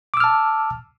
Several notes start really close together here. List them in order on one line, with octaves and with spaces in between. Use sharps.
D6 E6 F6 A5